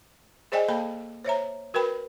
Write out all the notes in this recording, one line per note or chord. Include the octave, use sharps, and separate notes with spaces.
G#4 C5 D5 D#5 G5 G#5
A#3 A4 F5 A5 B5
C5 C#5 E5 A#5
F#4 A#4 B4 G5 B5